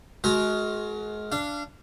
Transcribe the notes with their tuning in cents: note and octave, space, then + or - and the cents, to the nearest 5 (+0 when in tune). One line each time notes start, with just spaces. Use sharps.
G#3 +30 F#4 +0 A#4 +0
D4 -10 F5 -30